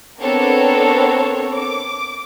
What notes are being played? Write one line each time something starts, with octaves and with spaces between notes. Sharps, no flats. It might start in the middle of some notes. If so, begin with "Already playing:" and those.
B3 C4 D4 A4 A#4 C#5
D6